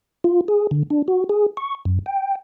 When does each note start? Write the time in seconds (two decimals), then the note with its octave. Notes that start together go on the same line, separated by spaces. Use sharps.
0.24 F4
0.48 G#4
0.71 D3
0.90 D4
1.08 F#4
1.29 G#4
1.57 C#6
1.85 F#2
2.06 G5